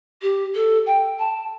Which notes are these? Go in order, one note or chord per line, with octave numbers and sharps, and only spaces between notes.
G4
A4
G5
A5